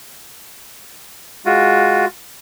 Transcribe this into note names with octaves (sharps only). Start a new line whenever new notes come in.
G#3 F4 F#4